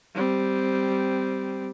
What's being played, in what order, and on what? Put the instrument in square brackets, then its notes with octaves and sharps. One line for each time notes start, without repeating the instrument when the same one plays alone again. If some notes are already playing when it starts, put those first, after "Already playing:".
[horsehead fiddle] G3 C4